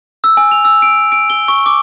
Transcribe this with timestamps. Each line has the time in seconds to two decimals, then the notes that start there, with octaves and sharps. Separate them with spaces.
0.24 E6
0.37 G#5
0.51 F7
0.65 E6
0.82 D7
1.12 D7
1.30 G7
1.48 C#6
1.66 D6